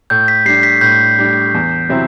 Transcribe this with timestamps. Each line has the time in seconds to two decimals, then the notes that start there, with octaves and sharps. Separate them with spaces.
0.10 A2 G6
0.28 B6
0.45 G3 D4 C7
0.63 B6
0.81 A2 G6
1.18 G3 D4
1.54 E2
1.89 C3 F#3 C4 E4